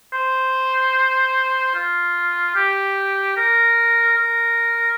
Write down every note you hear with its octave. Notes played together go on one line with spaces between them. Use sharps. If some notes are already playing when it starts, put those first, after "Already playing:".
C5
F4
G4
A#4
A#4